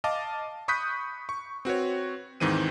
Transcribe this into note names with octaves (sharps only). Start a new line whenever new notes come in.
D#5 F5 A5 D6
B5 C#6 D#6 F#6 G6 B6
C#6
C4 F#4 B4 C#5
D#2 G#2 D#3 E3 C4 D#7